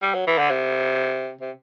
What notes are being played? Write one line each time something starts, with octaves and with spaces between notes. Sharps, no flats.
G3
F#3
E3
D3
C3
C3